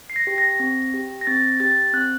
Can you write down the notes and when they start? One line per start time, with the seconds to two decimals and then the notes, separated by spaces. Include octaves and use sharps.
0.10 C7
0.16 A#6
0.27 G4
0.38 A#6
0.60 C4
0.94 G4
1.21 A#6
1.27 C4 A6
1.60 G4 A6
1.93 C4 F#6